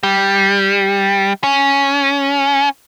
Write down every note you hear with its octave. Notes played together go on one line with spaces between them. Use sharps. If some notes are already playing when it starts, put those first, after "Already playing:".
G3
C#4